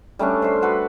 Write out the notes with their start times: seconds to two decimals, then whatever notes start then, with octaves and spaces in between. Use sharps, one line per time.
0.19 G3 A3 C#4 D4
0.42 C5 E5 C6
0.62 F#4 A4 B4 F#5